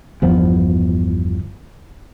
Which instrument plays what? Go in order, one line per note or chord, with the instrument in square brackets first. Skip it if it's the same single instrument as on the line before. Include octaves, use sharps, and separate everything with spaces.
[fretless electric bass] G1 E2 F3 B3